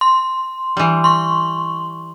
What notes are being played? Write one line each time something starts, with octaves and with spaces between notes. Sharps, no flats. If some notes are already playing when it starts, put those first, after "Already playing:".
C6
E3 G3
C6 C#6